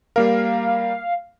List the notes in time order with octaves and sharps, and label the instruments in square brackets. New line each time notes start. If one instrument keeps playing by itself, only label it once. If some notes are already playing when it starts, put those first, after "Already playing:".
[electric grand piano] G3 A#3 A#4 [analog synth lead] F5